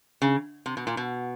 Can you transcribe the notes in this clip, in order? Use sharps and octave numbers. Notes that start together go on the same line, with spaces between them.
C#3
C3
B2
A#2
B2